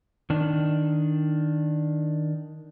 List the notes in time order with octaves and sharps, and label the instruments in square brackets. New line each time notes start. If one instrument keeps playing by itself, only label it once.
[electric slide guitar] D#3 D4